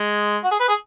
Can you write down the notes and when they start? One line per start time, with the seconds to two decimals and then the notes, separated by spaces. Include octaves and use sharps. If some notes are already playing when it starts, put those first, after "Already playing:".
Already playing: G#3
0.44 F#4
0.51 G#4
0.60 B4
0.69 G#4